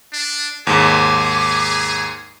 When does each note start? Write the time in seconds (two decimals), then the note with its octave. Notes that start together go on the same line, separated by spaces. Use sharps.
0.13 D4
0.67 D#2 G#2 G#4 D6